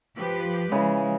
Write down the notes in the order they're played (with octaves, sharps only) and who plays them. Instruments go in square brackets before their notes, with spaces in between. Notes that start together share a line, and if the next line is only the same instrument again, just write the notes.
[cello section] F3 G4 B4
[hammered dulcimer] C#3 E3 [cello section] F3 G#3